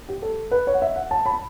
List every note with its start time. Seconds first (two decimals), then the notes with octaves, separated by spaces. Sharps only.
0.09 G4
0.22 A4
0.51 B4
0.67 C#5
0.74 F#5
0.82 E5
0.96 F#5
1.11 A5
1.26 B5